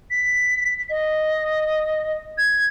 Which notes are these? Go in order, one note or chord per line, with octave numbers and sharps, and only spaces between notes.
B6
D#5
G#6